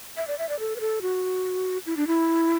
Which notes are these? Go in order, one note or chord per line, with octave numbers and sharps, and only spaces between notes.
E5
D5
E5
D5
A4
B4
A4
F#4
E4
D4
E4